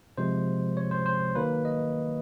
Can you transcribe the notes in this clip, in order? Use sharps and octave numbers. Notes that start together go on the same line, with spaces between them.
C3 F3 G#3 C5
C#5
C5
C5
D#3 F#3 A#3 B4
D#5